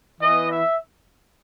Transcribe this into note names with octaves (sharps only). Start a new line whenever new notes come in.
E3 B3 D#5
E5